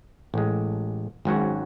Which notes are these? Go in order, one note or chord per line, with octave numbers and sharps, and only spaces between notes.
A1 A2 G#3
G#1 G#2 F#3 C#4 F#4